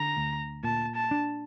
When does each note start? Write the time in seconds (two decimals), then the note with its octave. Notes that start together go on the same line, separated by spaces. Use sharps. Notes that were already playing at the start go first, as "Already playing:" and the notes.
Already playing: D3 A#5
0.17 D2
0.64 A#2 A5
0.95 A5
1.11 D4